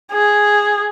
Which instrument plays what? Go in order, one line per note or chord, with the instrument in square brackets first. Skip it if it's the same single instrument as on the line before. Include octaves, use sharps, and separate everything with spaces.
[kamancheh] G#4